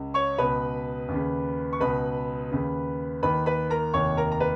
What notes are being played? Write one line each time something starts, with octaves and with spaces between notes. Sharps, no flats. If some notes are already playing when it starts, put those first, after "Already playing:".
Already playing: C#2 C#3
C#5 C#6
C#2 B2 B4 B5
D#2
C#3
C#6
C#2 B2 B4 B5
D#2 C#3
D#2 D#3 B4 B5
B4 B5
A#4 A#5
F1 D#2 D#3 C#5 C#6
A#4 A#5
A#5
B4